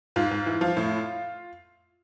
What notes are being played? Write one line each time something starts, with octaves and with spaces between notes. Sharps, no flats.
G#2 F4
G#2
E3
F3 F4
A2